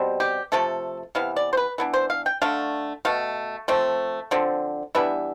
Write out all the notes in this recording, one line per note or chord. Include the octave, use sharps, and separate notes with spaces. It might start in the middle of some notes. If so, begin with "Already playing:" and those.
Already playing: B2 G3 C4
G4
C3 F3 A3 A4
C3 E3 B3 F5
D5
C5
B4
E3 B3 D4
C5
F5
G5
D3 A3 D4 F5
B2 A3 F5
F3 A3 C4
D3 F3 C4
E3 G3 B3 D4 E5